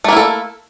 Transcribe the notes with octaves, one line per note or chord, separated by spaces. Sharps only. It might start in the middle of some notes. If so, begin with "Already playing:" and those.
A3 A#3 E4 A4